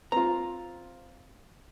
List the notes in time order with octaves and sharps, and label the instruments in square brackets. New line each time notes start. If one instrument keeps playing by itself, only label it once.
[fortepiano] C4 F4 [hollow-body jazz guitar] A#5